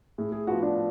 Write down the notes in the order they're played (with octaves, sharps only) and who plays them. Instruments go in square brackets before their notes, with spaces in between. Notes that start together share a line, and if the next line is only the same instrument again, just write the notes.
[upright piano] A2 [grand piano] G#4
[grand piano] G#4
[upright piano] F3 B3 F4 [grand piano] F#4
[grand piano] D4